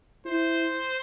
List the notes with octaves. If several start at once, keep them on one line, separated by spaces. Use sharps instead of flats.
E4 C5